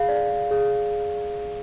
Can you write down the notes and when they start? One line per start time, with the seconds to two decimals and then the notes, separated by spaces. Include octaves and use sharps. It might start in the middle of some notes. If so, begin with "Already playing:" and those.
Already playing: G#4 F5
0.09 D5
0.51 G#4